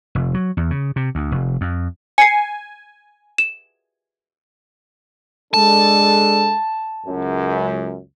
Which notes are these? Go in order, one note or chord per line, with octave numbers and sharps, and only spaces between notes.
F1
F#3
E2
C#3
C3
D2
F1
F2
G#5 C7 C#7
E7
G#3 D4 A4 A5
C#2 F#2